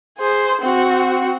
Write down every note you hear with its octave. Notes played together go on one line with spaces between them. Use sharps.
G#4 C5
C4 F#4